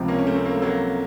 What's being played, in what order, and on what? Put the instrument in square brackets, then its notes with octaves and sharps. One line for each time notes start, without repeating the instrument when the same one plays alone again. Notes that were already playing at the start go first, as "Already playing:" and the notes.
Already playing: [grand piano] C#2 C3 F3
[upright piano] A#3 C#4
C#4
A3 C4
A#3
A3
F#3 A#3